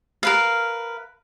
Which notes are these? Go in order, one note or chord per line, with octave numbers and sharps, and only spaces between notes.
A#4 B4 F5